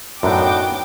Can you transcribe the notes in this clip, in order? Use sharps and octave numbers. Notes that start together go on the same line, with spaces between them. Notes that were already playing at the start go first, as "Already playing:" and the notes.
F#2 A2 B3 D4 D#4 F#4 G5 D6